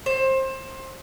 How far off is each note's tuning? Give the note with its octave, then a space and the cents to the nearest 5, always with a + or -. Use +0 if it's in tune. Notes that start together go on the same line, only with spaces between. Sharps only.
C5 +25